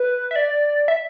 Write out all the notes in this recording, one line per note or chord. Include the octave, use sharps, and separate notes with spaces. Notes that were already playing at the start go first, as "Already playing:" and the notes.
Already playing: B4
E5
D5
E5